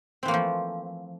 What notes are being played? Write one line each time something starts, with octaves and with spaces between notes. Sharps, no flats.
E3 F3 A3 A#3 C4